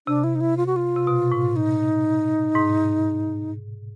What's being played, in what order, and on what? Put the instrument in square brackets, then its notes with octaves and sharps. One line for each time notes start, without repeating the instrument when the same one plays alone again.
[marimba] C3 [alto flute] D4
[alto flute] E4
D#4
E4
F4
F#4
F4
[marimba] C3
B2
A2
[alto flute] D#4
[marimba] G#2